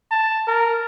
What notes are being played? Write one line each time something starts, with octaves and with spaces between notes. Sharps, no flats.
A5
A#4